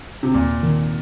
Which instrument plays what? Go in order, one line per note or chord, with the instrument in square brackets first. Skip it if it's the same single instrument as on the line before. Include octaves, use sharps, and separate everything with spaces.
[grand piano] C3
[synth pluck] D#2 [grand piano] A#2
[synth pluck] D#3